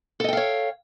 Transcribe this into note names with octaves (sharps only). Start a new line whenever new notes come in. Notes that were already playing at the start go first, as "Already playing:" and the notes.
A4 C#5 D#5 F5 G5